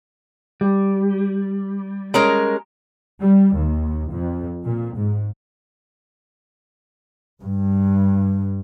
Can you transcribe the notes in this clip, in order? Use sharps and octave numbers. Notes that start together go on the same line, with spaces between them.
G3
G#3 C#4 A#4
G3
D#2
F2
A#2
G#2
G2